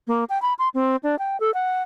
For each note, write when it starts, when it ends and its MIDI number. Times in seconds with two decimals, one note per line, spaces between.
0.07 0.24 58
0.29 0.40 79
0.42 0.54 83
0.59 0.69 84
0.74 0.96 60
1.03 1.18 62
1.19 1.39 79
1.40 1.53 69
1.54 1.83 78